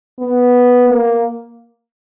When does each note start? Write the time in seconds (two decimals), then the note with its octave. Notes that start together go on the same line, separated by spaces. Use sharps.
0.19 B3
0.90 A#3